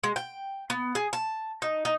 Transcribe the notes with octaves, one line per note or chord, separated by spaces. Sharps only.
G#3
G5
B3
G#4
A5
D#4
D#4